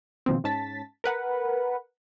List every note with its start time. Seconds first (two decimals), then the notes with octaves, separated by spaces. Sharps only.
0.26 B2 D#3 F3 A#3 C4
0.44 G#2 C#4 A5 A6 B6
1.04 A#4 B4 F#5